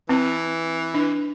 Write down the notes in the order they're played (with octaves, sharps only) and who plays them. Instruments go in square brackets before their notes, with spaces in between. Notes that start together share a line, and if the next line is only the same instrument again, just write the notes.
[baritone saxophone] E3 [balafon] C4
[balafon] D4